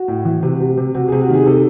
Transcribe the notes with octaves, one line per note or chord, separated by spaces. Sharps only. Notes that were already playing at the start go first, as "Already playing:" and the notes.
Already playing: F#4
A2
E3
C3
C3
C3
C3 F#4
G#4
C3
F#4
D#3 G#4
C3 A4